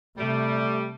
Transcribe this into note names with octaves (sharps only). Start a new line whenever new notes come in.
C3 G3 A3